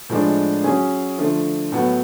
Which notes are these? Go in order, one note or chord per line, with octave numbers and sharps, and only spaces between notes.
A2 F3 G#3 D4
F#3 C#4 G#4
D3 F3 A3
A2 F#3 B3